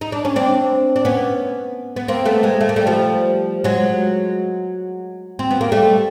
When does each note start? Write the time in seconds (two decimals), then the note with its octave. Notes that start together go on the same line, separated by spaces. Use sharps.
0.01 D#4
0.12 D4
0.25 C#4
0.36 C4 D4
0.96 D4
1.05 B3 C#4
1.96 B3
2.08 A#3 C4
2.26 A3 B3
2.43 G#3 A#3
2.61 A3
2.69 A#3
2.76 G3 A3
2.87 F3 G3
3.64 F#3 G#3
5.39 C4
5.51 B3
5.61 A#3
5.72 G3 A3